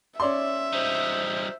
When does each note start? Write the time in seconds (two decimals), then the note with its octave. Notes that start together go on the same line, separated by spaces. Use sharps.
0.20 C#4 D5 E5 C6
0.73 G3 D#4 C5